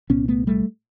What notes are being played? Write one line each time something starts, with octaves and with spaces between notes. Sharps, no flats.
C2 A#2 B3 C#4
A3 B3
G3 A3